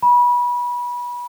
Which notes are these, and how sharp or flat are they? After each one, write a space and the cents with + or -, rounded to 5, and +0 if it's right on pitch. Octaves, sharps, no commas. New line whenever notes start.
B5 -25